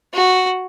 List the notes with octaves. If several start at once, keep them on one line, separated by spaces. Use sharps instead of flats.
F#4